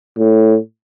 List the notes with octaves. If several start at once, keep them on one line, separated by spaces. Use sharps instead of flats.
A2